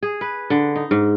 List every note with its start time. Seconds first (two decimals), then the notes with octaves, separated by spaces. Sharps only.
0.03 G#4
0.21 B4
0.50 D3
0.76 D#4
0.91 G#2